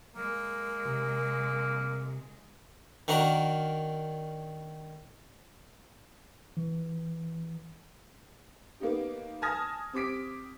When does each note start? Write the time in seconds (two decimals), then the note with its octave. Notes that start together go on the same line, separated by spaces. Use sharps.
0.16 G#3 A#3 A#4
0.85 C3
3.08 D#3 D4 F#4 A#4
6.57 E3
8.80 A#3 B3 D#4 G4
9.42 G#5 A5 D#6 F6 G#6 A#6
9.93 C4 G4 D6 B6 D7